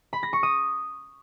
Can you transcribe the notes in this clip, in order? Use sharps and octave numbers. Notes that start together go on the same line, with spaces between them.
B5
A#6
C#6
D#6